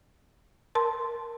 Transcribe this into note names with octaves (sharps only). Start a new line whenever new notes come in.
A#4 A5 C6